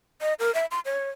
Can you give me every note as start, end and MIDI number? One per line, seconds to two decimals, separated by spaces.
0.21 0.34 75
0.40 0.53 70
0.55 0.66 76
0.71 0.80 84
0.85 1.10 73